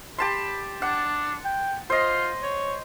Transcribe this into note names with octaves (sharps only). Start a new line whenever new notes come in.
G4 A5 B5 C6
D4 F#5
G5
F4 C5 D#5
C#5